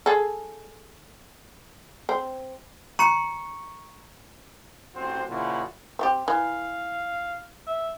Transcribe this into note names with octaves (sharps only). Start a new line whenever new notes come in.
G#4 A4
C4 C5
A#5 C#6 C#7
A1 C4 F#4 C5
A#2 C#3 F3 E4 F#4
C4 F4 G4
E3 F5
E5